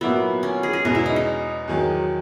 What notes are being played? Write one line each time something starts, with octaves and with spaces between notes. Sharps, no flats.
A#2 F#3 A#3 B3 E4
C#4
G#4
G#4
E2 B2 G#3 A#4
E4
D#4
D#4
E2 D#3 F#3